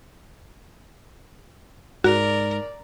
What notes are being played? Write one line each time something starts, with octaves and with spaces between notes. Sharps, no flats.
G#2 F#4 A#4 D5